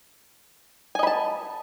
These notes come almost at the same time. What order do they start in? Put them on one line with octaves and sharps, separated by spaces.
G#5 D#5 B5 A5